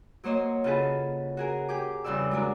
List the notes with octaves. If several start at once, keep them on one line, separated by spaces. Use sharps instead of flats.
F#3 A#3 C5 C#5 D#5
C#3 F4 F#4 G#4 A4 B4
F#4 G#4 A#4
G4 G#4 D6
E2 G2 C#3 C4 D5 E6
F#3 G#3 D4 A#4